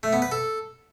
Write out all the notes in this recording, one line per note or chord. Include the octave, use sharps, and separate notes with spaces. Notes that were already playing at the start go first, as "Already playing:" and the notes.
A3
B3
B4
A4